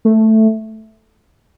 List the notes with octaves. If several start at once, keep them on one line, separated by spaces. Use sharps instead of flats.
A3